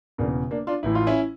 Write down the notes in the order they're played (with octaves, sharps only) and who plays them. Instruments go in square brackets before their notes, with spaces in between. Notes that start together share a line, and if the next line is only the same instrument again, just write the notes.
[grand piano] E1 E2 C#3 A#3 D4
A#3 D4
D4 F4
A1 A2 E3 E4
F4
C#4 E4